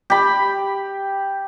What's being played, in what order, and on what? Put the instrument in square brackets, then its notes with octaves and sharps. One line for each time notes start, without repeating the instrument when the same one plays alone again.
[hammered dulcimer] G4 B5